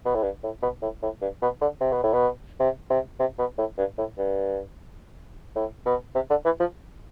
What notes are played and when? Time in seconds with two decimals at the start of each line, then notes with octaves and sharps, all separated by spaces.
0.06 B2
0.15 A2
0.24 G2
0.44 A2
0.63 B2
0.82 A2
1.03 A2
1.22 G2
1.42 B2
1.61 D3
1.81 C3
1.93 B2
2.04 A2
2.14 B2
2.60 C3
2.90 C3
3.20 C3
3.39 B2
3.58 A2
3.78 G2
3.98 A2
4.18 G2
5.56 A2
5.86 B2
6.15 C3
6.30 D3
6.45 E3
6.60 F3